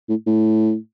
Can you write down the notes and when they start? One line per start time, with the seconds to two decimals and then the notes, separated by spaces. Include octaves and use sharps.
0.09 A2
0.27 A2